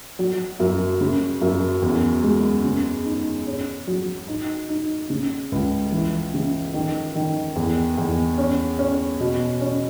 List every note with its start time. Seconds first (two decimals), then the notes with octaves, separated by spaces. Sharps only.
0.19 F#3
0.60 F#2
1.01 C#3
1.41 F#2
1.82 E2
2.24 G#3
2.65 C#3
3.05 D#4
3.47 C#4
3.87 F#3
4.28 D#4
4.69 D#4
5.10 C#3
5.52 C#2
5.92 E3
6.34 C#3
6.74 D#3
7.16 D#3
7.56 E2
7.97 E2
8.38 C#4
8.79 C#4
9.20 B2
9.61 C#4